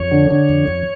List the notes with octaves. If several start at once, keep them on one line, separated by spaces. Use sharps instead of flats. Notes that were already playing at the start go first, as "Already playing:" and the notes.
Already playing: F2 C#5
D3
D3
F2
F2